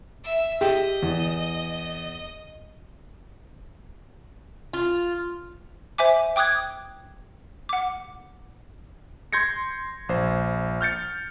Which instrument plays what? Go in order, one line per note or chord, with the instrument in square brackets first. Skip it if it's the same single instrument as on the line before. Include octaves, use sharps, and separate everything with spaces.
[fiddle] E5
[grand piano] G4 [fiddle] D#5
[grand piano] E2
[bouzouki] F4
[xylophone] C5 E5 G#5 D6
G5 D6 D#6 F#6 G#6
F#5 D6
[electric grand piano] C6 G6 G#6 A#6 C#7
A#1 C5
F6 G6 A6 C#7